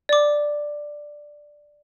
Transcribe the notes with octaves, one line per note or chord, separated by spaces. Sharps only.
D5 D6